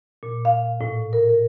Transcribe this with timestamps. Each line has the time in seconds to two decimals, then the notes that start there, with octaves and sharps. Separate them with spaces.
0.23 A#2
0.45 F5
0.81 A2
1.13 A#4
1.29 A#4